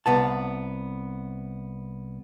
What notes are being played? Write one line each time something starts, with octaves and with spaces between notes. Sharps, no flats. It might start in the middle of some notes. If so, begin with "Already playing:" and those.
C2 B3 A5